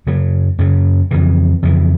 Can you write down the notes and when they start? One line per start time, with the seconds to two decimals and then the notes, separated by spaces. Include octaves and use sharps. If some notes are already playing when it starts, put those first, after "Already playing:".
0.07 F#2 C#3 F#3
0.59 F#2 C#3 F#3
1.11 F2 C#3 E3
1.63 F2 C#3 E3